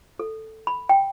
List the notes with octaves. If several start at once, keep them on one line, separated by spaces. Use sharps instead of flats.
A4
B5
G5